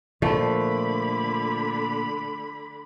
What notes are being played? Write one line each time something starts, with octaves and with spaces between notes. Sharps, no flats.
A#2 D3 F3 A3 B5